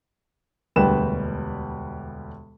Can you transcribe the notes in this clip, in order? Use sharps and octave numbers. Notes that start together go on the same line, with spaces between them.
E1 D2 G3 B4 E7